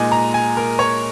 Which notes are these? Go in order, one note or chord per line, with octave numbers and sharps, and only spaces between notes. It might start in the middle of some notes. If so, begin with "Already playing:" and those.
Already playing: A#2 G#3 D#4 G#5
A#5
G#5
A#4
C#5